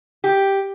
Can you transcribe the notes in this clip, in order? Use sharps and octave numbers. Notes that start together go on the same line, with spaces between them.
G4